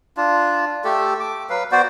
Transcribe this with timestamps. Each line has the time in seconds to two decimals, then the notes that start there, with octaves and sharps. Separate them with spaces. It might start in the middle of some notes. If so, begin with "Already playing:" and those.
0.17 D4 F4
0.84 A3 G4 A4
1.20 D6
1.50 F#3 B4 F5
1.72 B3 F#4 C5 D5